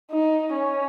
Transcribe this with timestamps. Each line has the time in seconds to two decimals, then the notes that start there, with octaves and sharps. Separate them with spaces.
0.11 D#4
0.53 C#4